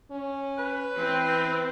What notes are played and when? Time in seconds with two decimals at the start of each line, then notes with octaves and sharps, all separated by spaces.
0.11 C#4
0.58 B4
0.98 E3 C4